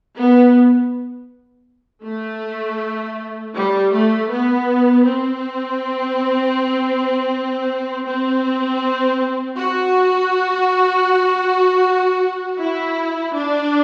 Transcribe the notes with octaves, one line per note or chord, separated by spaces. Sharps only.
B3
A3
G3
A3
B3
C4
C4
F#4
E4
D4